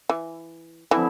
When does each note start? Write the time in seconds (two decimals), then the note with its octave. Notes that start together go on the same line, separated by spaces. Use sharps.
0.09 E3
0.91 D3 E3 F3 C4 E4